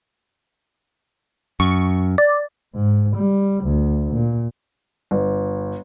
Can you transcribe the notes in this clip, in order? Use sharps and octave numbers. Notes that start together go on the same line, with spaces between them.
F#2 C#6
D5
G#2
G3
D2
A#2
G1